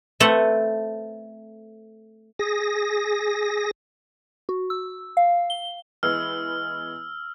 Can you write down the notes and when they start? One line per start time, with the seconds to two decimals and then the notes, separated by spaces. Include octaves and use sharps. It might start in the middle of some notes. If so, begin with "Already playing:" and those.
0.20 A3 C4 A4 B4 F#5
2.39 G#4 A#6
4.49 F#4
4.70 E6
5.17 F5
5.50 G7
6.03 E3 G#3 B3 E6 F6